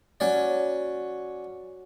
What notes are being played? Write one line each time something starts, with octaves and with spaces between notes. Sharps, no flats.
F#3 C#4 C#5 D5